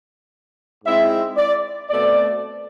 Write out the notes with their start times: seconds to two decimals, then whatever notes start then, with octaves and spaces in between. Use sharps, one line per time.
0.83 G#2 G#3 C4 E4 E5
1.36 D5
1.90 B2 A3 C4 D5